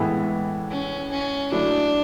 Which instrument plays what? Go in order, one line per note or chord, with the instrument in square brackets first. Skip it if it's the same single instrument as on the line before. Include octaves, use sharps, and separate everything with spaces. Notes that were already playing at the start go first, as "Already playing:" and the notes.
Already playing: [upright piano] A2 E3 G#3 B3 E4
[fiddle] C#4
C#4
[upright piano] F#3 A3 E4 [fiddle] D4